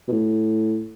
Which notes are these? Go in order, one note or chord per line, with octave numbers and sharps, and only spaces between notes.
B2
A2